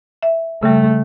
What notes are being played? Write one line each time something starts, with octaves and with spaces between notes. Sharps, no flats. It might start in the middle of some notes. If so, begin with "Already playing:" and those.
E5
C#3 G3 A3